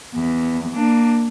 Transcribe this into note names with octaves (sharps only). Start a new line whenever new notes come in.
E2
A#3 D4